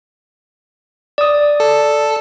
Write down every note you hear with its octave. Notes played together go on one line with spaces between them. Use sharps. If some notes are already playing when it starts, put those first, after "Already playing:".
D5 D#6
A4